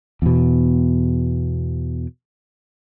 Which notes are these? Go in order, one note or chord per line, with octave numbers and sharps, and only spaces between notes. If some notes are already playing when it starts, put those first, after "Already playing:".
E2 B2